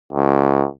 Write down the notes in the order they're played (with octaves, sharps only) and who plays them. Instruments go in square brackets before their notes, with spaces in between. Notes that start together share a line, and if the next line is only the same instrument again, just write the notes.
[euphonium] C#2